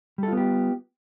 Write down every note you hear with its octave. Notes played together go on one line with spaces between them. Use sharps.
G3 B3 F4 G4 A4